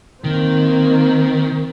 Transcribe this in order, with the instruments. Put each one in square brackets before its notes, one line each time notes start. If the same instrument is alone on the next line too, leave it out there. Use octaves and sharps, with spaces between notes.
[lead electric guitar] D#3 [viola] A#3 C4